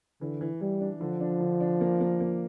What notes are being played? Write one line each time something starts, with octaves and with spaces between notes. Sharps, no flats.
D3 E3
E3
E3 G3
D4
D3 F3
D4
D3
D4
A#3
A#3
A#3